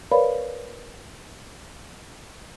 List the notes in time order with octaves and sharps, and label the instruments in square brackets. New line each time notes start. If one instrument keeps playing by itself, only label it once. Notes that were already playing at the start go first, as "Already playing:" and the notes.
[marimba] A#4 B4 C#5 D5 F5 B5